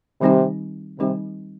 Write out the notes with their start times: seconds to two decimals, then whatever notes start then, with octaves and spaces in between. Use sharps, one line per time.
0.21 C3 D#3 G3 C4 D#4 G4
0.99 C3 D#3 G3 C4 D#4 G4